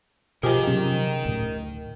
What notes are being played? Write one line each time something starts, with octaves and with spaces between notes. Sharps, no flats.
B2 F3 G4 G#4 A#4 D#5
C3 F#3 C#4
D2 A2